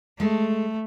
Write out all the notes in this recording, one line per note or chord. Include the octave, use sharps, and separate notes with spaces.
G#3 A3 A4